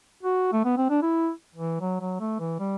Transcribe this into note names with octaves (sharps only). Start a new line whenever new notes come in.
F#4
A3
B3
C4
D4
E4
E3
F#3
F#3
A3
E3
G3